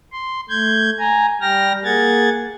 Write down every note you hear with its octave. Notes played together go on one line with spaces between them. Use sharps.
C6
A3 G6 G#6
G#5 A#5
G3 G5 F6 A#6
A#3 G#4 F#5 G#6 A6